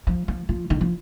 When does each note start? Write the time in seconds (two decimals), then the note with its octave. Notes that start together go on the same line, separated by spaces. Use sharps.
0.07 F3
0.28 F3
0.49 F3
0.70 D#3
0.81 F3